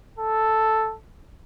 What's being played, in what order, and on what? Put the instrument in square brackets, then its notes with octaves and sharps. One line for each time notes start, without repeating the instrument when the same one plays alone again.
[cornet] A4